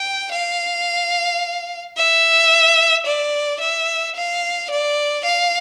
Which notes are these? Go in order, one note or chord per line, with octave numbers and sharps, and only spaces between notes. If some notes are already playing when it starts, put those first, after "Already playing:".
Already playing: G5
F5
E5
D5
E5
F5
D5
F5